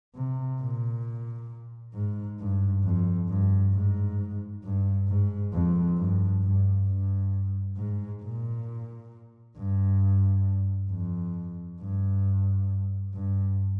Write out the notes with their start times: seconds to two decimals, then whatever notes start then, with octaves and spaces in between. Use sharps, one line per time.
0.15 C3
0.60 A#2
1.94 G#2
2.39 G2
2.84 F2
3.29 G2
3.73 G#2
4.63 G2
5.08 G#2
5.53 F2
5.98 G2
6.43 G2
6.87 G2
7.77 G#2
8.22 A#2
9.57 G2
10.91 F2
11.81 G2
13.14 G2